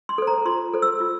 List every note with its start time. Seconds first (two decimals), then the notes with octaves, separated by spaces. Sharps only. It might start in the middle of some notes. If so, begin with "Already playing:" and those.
0.09 C6
0.18 A4 C5
0.27 A#5
0.45 F4 C6
0.74 A4 C5
0.82 E6
1.00 F4